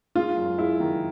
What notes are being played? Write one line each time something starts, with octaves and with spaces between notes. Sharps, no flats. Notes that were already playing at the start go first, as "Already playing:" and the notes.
G#3 F4
F#2
G#3 E4
D#3